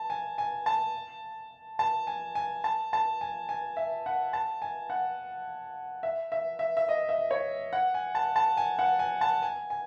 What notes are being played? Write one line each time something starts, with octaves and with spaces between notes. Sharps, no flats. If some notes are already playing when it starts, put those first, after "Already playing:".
Already playing: A5
G#5
G#5
A5
A5
G#5
G#5
A5
A5
G#5
G#5
E5
F#5
A5
G#5
F#5
E5
E5
E5
E5
D#5
E5
C#5
F#5
G#5
A5
A5
G#5
F#5
G#5
A5
G#5
G#5